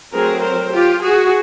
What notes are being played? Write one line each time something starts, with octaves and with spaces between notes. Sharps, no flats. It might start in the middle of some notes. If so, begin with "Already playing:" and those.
F#3 A3 C4 G#4 A#4
A#4 C5
F4 G4
F#4 G#4